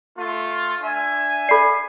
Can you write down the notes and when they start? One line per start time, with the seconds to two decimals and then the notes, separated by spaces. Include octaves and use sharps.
0.18 A3 F4
0.82 D4 E5 G#5
1.49 A4 D5 B5 C7